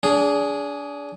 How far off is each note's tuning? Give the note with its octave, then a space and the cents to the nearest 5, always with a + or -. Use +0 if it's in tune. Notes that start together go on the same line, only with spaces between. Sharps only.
D4 -30 G#4 +0